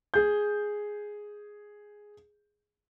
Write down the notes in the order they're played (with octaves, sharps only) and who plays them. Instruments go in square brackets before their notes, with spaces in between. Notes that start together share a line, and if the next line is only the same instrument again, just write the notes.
[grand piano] G#4 G6